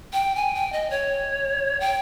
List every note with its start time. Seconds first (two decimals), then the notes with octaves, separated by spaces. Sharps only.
0.13 G5
0.36 G#5
0.55 G5
0.73 D#5
0.91 C#5
1.80 G5